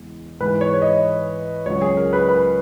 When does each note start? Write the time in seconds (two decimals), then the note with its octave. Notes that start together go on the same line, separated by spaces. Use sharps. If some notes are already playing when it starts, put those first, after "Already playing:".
Already playing: E2 C#3 G#3
0.40 G#2 E3 G#3 B4
0.61 C#5
0.74 C#5
0.82 D#5
1.66 C#2 C#3 F#3 C#5
1.82 G#4
1.97 A#4
2.13 B4
2.29 B4